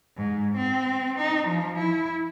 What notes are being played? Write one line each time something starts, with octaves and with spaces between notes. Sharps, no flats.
G#2
C4
D#4
F3
E4